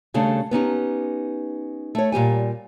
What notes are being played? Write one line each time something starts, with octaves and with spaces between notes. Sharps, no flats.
D#2 C#3 G3 A3 D4
B3 C#4 D#4 G4
A3 C#5
A#2 G3 G4 G#5